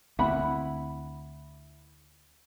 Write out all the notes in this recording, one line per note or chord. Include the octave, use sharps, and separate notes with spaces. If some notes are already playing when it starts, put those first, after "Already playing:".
D2 C4 E4 F#5 B5